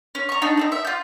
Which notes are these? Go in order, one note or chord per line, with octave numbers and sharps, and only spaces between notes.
C#4
A#5 C#6
D4 D#4
A3 C4 D#4
E5
F4 G6